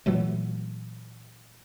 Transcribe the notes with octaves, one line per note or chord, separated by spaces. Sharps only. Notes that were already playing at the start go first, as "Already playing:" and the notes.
A#2 E3 F#3 A3